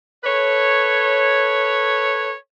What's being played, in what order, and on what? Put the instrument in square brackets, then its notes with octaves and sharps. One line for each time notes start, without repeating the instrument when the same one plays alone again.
[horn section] A4 B4 C#5